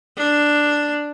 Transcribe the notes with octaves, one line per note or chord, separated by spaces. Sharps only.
D4